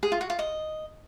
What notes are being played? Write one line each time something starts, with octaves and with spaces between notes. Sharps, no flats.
G#4
F4
F#4
F4
D#5